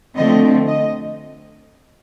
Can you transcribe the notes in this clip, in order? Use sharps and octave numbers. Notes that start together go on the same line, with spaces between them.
D3 F3 A3 C4 D#5
D#5